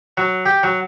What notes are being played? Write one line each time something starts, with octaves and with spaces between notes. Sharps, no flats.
F#3
G4
F#3